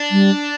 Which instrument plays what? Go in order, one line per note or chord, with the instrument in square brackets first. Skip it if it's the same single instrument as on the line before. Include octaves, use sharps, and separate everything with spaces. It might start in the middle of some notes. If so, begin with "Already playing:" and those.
Already playing: [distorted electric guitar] D4
[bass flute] G3